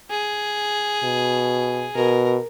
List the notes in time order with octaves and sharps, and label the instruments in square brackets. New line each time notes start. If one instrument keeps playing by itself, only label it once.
[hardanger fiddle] G#4
[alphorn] B2
[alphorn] B2 [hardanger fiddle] A#4